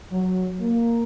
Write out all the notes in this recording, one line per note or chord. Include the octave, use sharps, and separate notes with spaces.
F#3
A#3